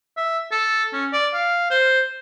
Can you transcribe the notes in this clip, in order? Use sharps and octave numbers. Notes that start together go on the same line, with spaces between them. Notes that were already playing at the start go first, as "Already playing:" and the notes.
E5
A4
C#4
D5
F5
C5